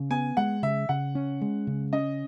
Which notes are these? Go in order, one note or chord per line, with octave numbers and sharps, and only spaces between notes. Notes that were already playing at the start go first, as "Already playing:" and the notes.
Already playing: C#3
B3 G#5
G#3 F#5
C#3 E5
C#3 F#5
C#4
G#3
C#3
C#4 D#5